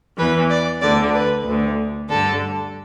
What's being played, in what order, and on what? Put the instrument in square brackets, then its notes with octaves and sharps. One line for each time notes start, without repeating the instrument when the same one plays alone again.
[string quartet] E2 E3 B4
D5
D2 D3 D5
B4
D2 D3
G2 D3 A4